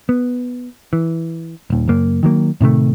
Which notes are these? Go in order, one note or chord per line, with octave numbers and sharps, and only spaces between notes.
B3
E3
D#1 D#2
F#1 F#2 A#3
D#3 F#3 A#3
A2 C3 D#3 A3